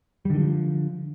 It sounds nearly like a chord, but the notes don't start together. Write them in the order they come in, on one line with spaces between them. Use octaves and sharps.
G3 D3 D#3 F3